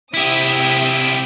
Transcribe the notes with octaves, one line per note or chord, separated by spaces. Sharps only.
C3 E4 G4 E5 D#6